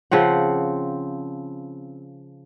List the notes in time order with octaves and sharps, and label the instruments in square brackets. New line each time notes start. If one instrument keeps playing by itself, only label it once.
[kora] C#3 F3 C4 F#5